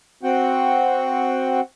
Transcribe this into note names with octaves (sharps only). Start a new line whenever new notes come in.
C4 F#4 F#5 G5